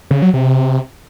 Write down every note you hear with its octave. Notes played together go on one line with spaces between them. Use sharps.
C#3
F#3
C3